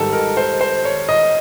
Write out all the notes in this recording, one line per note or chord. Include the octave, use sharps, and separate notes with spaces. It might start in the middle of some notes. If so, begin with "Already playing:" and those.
Already playing: G#2 D#3 G3 A4
A#4
C5
C5
C#5
D#5